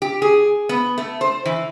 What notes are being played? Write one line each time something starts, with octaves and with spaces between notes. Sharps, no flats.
G4
G#4
B3
A3
C5
E3